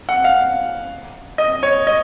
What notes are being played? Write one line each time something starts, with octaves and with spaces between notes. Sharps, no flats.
F#5
F5
D#5
C#5
D#5